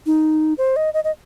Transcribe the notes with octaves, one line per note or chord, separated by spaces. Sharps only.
D#4
C5
D#5
D#5
D#5